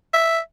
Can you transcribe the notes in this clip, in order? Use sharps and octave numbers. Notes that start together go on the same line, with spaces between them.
E5